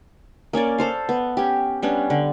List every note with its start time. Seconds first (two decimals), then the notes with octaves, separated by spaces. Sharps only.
0.53 A#3 C#4 C#5 D5
0.78 A4 C5 F5
1.09 B3
1.37 C#4 G4
1.82 G3 B3 C#4 D4
2.10 D3